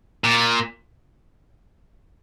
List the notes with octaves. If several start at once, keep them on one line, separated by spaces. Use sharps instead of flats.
A#2